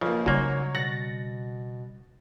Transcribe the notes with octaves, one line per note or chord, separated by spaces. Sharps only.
B1 C#3 F3 A#3
G#2 C#3 F#3 G3 A#3 C#5
B2 F#5 A6 A#6